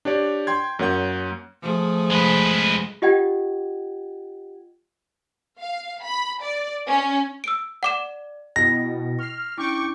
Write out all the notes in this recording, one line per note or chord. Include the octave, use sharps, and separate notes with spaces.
D4 G4 C#5 D5
G5 C6 G#6
F#2 A#3 C#5 F#5 G6
F3 A3 G#4
G#3 B4
F4 G4 D#5 F#5 G5 G#6
F5
B5
D5
C#4
E6 D7
D5 F#5 D6 E7
B2 E4 D#5 G5 A#6
C#6 F6 C7
C#4 D4 E4 G5 C#6 D6